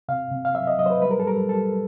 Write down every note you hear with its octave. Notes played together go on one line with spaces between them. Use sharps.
C3 F5
C3
F5
F#3 E5
D#5
F#3 D#5
C5
B4
G3 B4
A#4
A4
G3 A#4
G3 A4